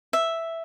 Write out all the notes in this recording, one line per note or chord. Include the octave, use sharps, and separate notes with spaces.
E5